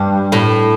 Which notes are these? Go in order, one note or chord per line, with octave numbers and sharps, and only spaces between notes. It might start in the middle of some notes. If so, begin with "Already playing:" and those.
Already playing: G2
A2